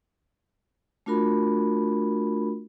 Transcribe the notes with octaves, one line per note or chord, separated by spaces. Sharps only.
A3 D4 F4 F#4 A#4 B5